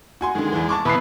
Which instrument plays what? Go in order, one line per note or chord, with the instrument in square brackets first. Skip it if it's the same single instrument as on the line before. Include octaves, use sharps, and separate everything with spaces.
[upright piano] F#4 G#5 C6
[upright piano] D3 D#3 [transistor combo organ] G#3
[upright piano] E2 E3
A5 C#6 D6
[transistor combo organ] B2 E3 B3 [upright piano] B5 F#6 C7